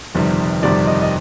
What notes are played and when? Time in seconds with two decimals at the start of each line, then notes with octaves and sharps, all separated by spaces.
0.15 G1 F2 C3 D#3 G3
0.63 G1 F2 C3 D#3 G3 D5
0.87 D#5
1.02 D#5